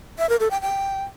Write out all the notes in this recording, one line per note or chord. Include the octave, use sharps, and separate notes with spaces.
E5
A#4
A4
G5
G5